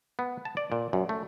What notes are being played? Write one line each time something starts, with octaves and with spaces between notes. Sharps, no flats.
B3
A5
D5
A#2
F#2
A3